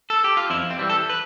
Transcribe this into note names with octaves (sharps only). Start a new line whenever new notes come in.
A4
G4
F4
F2 E4
C4
E3 G3
A4
B4